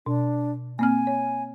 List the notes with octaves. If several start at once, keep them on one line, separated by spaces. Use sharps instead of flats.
B2 D4
A#3 C4 G#5 F6
C#5